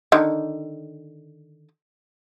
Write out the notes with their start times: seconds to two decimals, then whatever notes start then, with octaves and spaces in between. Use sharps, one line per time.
0.12 D3 D#3